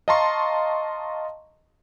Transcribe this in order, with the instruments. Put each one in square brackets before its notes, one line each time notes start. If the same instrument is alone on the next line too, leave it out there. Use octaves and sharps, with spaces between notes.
[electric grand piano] D#5 F5 A5 A#5 C6 C#6